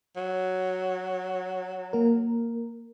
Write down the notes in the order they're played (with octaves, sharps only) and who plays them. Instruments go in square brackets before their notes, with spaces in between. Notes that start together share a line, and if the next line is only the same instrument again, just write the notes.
[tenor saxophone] F#3
[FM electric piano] A#3 A#4